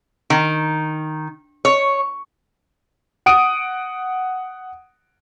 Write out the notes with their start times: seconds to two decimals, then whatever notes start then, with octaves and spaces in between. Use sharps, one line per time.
0.30 D#3
1.65 C#5
3.26 F#5 D#6 D7 D#7